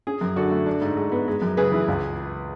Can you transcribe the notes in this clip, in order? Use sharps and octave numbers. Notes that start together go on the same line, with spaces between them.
C#4 G#4
F#2
D3 F#4 A4
A3
D4
G#2
G#3
B3
G#3
F#2
C#3 G#4 B4
E3
C#2